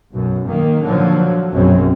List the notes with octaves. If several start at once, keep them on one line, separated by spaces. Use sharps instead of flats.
B1 F#2
D#3 A#3
A#2 D3 F3 F#3
A#1 F#2 B2 C4 C#4